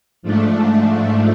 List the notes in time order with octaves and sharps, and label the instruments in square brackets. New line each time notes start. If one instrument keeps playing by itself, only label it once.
[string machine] G#2 F3 A3 D4